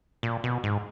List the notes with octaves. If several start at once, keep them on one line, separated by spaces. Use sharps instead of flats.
A#2
B2
G#2